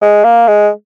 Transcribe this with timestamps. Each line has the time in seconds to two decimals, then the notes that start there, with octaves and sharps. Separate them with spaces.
0.02 G#3
0.24 A#3
0.48 G#3